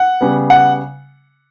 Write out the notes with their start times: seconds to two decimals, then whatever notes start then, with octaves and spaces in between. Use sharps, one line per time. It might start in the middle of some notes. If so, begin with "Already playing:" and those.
Already playing: F#5
0.21 C#3 G3 B3
0.50 F#5